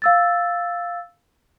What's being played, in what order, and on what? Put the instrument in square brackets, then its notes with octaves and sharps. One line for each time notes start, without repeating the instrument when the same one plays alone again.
[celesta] F5 E6 A6